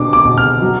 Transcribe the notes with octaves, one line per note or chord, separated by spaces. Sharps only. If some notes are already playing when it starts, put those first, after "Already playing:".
Already playing: B2 D4 D6
D6
B2
F6
F#3